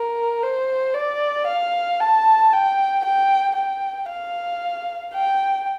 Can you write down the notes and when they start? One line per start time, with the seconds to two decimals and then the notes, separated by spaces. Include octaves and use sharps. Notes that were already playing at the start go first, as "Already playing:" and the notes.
Already playing: A#4
0.43 C5
0.95 D5
1.47 F5
2.00 A5
2.53 G5
3.05 G5
3.57 G5
4.10 F5
5.14 G5